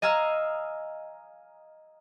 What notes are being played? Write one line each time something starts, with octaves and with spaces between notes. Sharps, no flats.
D#5 F5 G#5 A#5 E6